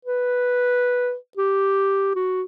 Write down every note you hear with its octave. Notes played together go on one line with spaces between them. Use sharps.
B4
G4
F#4